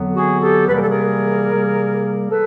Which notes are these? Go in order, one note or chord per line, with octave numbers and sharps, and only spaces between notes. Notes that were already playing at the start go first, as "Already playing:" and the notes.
Already playing: F2 D3 F#3 B3
F#4 G#4
G4 A4
C3 E3 G3 A#3 B4
A#4
A4
G#4 A#4
C3 E3 G3 A#3
A4 B4